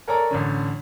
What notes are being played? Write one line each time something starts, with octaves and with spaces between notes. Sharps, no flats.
A4 A#4 C#5 D5 G#5 A#5
A1 D3 C#4